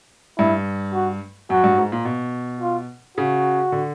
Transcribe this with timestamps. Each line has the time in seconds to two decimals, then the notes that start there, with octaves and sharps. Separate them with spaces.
0.38 G2 E4
0.94 F#4
1.50 F#2 F#4
1.64 G2
1.78 G#2
1.92 A#2
2.05 B2
2.61 F4
3.17 C#3 F#4
3.72 D3